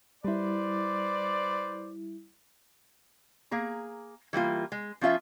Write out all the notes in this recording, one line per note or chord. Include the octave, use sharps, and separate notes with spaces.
G3 E4 B4 C5 D5
A#3 G#4 A#5
E3 G3 A#3 F4
G#3
F3 C#4 F4 E5